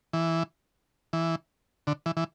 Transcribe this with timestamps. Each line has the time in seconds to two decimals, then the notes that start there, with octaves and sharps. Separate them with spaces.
0.13 E3
1.13 E3
1.87 D3
2.06 E3
2.17 E3